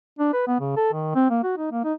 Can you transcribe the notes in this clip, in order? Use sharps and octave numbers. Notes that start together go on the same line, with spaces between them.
D4
B4
B3
C#3
A4
D#3
C4
A#3
F#4
D#4
A#3
D#4